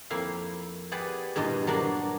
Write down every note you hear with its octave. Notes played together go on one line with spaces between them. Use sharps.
F2 A#3 E4 F5
G4 G#4 B4 D5 F#5
E2 G2 A#2 F4 D#5
F#3 A#3 D4 A#4